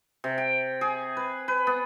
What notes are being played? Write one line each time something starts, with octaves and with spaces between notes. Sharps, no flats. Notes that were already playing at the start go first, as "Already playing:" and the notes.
C3
G5
G#4
B4
B4
B3